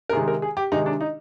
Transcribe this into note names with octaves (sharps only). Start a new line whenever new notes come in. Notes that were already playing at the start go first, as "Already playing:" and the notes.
A#4
C3 D#3 G#3 G#4
A#4
G#4
G4
C3 D#3 G#3 D#4
D4
D#4